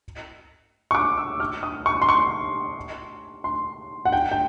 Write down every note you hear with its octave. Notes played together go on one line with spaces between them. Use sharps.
C#6
D6
E6
F6
D#6
C#6
C6
C#6
C6
F#5
G5
G5